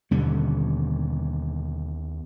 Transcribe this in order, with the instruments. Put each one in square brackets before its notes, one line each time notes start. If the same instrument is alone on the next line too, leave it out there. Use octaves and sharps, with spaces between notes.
[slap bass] D#2 B3 C#4 [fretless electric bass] B2 D3 G3